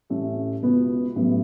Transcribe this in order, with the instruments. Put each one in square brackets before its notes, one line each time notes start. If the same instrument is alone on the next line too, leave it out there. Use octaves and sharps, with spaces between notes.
[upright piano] A1 A2 A3 C#4
C#2 B2 B3 F#4
A1 A2 F#3 B3